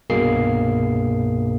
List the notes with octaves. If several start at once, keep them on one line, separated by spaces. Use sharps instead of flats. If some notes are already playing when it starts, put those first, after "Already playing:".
C2 G2 B2 A#3 G#4 C7